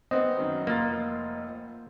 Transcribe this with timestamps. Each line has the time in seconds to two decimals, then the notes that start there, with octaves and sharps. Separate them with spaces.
0.11 B3 C4 D#5
0.37 F#2 D#3 F#3
0.67 F1 A#3 F4 A6